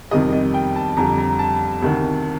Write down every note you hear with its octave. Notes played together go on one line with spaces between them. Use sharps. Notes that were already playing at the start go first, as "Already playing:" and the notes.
F2 C3 D#3 G3 D#5
D#5
G5
A5
F2 D3 G3 A#5
A#5
A5
D2 C3 D#3